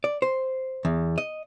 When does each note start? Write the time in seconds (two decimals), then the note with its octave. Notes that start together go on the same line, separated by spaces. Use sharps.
0.04 D5
0.22 C5
0.85 E2
1.18 D#5